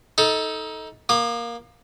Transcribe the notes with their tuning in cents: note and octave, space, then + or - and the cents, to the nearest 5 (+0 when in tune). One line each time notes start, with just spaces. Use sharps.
D#4 +20 A4 +0
A#3 +10 D#6 -40